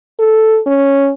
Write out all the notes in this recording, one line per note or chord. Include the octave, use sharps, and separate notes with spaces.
A4
C#4